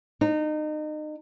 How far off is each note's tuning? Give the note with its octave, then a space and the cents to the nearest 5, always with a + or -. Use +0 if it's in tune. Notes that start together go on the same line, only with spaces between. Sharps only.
D#4 -30